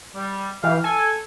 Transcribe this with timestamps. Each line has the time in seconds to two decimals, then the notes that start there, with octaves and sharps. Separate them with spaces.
0.15 G3
0.64 E3 G4 F5
0.84 A4 G#5